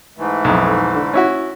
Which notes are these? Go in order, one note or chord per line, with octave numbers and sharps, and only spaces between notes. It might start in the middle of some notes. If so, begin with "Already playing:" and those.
G#2 E3 A3
B1 F2
D3
C#4 E4 F#4